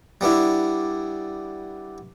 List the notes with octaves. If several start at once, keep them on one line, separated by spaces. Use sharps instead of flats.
G3 B3 D4 E4